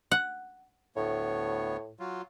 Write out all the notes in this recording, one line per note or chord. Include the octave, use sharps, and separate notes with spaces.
F#5
D2 A2 B3 C#5
F#3 F4